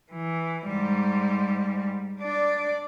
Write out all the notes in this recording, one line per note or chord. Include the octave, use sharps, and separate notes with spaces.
E3
G#2 G3
D4 D5